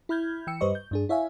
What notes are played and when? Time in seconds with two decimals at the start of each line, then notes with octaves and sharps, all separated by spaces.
0.09 E4 B5 F6 G6 G#6
0.47 E3 G5 E6 C#7
0.61 G2 G3 B4 C5 D#5 C#6
0.75 G6
0.91 G2 D4 G#4
1.09 E4 C#5 E5 F5 G#5